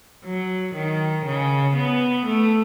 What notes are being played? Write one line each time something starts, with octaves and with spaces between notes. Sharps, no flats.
F#3
D#3
C#3
B3
A3